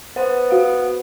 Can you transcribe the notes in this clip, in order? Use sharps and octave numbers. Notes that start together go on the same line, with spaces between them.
B3 C5 F#5
F#4 F5